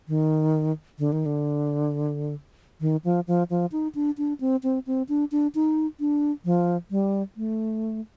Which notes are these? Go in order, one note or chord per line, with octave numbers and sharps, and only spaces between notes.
D#3
D3
D#3
D3
D#3
F3
F3
F3
D#4
D4
D4
C4
C4
C4
D4
D4
D#4
D4
F3
G3
A3